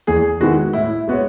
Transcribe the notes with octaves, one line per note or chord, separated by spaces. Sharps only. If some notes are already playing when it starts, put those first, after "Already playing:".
E2 G#4
D#3 G#3 B3 E4 F#4
A2 E4
G#3 B3 F#4 C#5